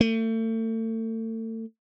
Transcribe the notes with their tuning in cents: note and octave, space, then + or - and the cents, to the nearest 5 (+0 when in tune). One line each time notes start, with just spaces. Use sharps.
A3 +35